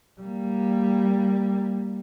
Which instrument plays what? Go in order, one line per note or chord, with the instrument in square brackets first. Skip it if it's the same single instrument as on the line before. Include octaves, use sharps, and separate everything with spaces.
[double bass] G3 A#3